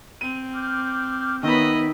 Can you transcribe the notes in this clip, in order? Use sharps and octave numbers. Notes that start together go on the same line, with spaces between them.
C4 D#7
D6 F6 G6
D#3 B3 C#5 D#5 E5 B5 E6